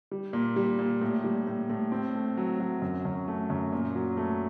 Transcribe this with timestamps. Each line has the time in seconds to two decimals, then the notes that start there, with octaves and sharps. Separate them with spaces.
0.11 G3
0.33 A#2
0.56 G3
0.79 A#2
1.01 A2
1.24 G3
1.47 A2
1.70 A2
1.92 C4
2.15 A3
2.37 F#3
2.60 F#3
2.82 F#2
3.05 F#2
3.28 A3
3.50 F#2
3.72 A#2
3.95 F#3
4.17 A3